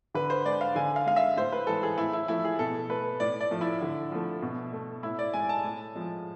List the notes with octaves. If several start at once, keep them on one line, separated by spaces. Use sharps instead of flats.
D3 B4
C5
G#3 D5
F5
D3 G#5
F5
G#3 F5
E5
A2 C5
B4
E3 G#3 A4
G#4
A2 E4
E4
F3 A3 E4
G#4
B2 A4
A3 B4
A2 D5
D5
F3 A3
E4
D3
F3 A3
B2
A3
A2 E4
D5
G#3 G#5
A5
A2
F3 G#3